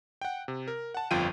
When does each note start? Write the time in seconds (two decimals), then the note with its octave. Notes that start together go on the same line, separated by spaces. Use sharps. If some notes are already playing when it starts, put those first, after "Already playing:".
0.21 F#5 G5
0.48 C3
0.68 A#4
0.94 F#5 A5
1.11 G1 F2 F4 G5 D#7